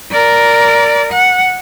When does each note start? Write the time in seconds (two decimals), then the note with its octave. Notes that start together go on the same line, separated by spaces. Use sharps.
0.11 A#4 D5
1.12 F#5